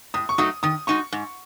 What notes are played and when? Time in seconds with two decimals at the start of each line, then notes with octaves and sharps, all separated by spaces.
0.14 A2 D#6
0.29 C#6
0.38 F#3 A3 D#4 F#4 D#6
0.63 D#3 D#6
0.87 G#3 D#4 F#4 C#6
1.12 G#2